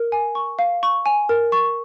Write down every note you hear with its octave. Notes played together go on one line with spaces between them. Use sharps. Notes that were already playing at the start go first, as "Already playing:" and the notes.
Already playing: A#4
G#5
C#6
F5
C#6
G#5
A#4
C#6